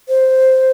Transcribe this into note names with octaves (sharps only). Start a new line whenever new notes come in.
C5